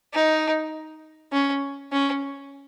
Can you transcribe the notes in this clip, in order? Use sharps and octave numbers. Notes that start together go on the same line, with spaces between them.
D#4
C#4
C#4